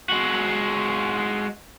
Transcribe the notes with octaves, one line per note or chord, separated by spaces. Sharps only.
G#3 F#4